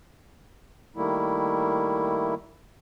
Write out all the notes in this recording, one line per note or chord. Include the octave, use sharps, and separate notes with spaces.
D#3 G3 A3 A#3 E4